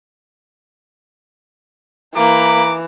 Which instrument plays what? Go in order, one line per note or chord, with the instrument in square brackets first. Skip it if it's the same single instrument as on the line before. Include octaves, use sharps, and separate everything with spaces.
[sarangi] E3 [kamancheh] A#3 B5 [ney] A#5 [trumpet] D6